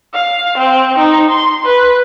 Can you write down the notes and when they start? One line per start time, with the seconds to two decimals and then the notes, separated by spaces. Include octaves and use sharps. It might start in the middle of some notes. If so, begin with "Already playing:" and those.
0.14 F5
0.58 C4
0.98 D#4
1.30 C6
1.65 B4